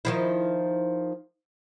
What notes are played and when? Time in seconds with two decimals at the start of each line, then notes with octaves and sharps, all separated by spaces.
0.05 D#3 F3 E4